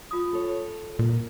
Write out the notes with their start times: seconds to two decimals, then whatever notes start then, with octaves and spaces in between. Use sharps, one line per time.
0.11 F4 D#6
0.33 A4 C#5
0.99 A#2 A#3